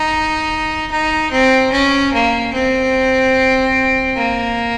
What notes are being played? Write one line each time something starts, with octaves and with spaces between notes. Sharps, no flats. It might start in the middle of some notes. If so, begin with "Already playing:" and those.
Already playing: D#4
D#4
C4
C#4
A#3
C4
A#3